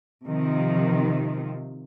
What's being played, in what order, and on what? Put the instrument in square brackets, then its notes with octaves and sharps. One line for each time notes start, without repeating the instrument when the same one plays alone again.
[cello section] C3 D#3 F3